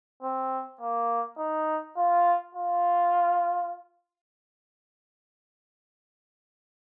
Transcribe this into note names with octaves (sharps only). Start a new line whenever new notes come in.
C4
A#3
D#4
F4
F4